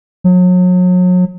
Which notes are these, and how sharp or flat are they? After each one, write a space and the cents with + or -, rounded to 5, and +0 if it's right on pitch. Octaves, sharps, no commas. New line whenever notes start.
F#3 -35